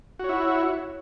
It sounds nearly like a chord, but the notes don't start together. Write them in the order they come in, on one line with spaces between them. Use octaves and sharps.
F#4 C#5 E4